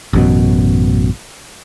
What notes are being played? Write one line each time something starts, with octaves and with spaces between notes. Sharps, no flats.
A1 F#2 B2